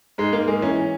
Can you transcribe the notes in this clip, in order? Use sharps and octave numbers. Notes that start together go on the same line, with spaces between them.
G#2 G#3
G#2 A#3
G#3 A#3
E3 C#4